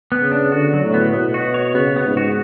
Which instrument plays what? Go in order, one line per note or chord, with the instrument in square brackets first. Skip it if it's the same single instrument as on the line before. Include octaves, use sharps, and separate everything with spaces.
[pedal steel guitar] B3
[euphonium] C#3
[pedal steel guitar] D4
[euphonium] D3 [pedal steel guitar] F#4
[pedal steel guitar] F#3
[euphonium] A2
[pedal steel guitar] B3
[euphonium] B2 [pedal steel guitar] B3
[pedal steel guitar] F#4
C#5
[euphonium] C#3 [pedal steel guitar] B3
[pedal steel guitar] B3
[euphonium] G#2
[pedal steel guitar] F#4